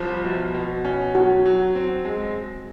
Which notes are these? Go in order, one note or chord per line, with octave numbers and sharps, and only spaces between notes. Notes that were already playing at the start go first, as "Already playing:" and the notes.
Already playing: C2 F3
B2
B2
C#4
F#3 F#4
F#3
C4
G#3